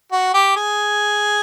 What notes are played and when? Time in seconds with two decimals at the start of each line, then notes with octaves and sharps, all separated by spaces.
0.12 F#4
0.34 G4
0.56 G#4